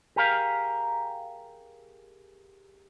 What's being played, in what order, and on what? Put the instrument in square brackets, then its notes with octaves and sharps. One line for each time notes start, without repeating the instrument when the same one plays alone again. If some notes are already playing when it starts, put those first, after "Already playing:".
[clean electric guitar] G4 G#4 A#4 F5